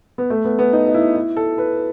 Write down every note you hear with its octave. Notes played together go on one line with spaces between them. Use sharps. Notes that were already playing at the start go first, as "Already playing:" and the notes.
B3
A3
B3
B3
D#4
D#4
E4
E4
A4
B4